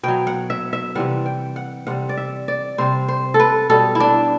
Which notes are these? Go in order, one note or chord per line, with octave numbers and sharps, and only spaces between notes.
B2 F#3 G5
F#5
E5
E5
C3 E3 G3 F#5
G5
F#5
C3 G3 F#5
D5
E5
D5
C3 G3 C5
C5
A4
B4
B2 G3 A4
E4
D4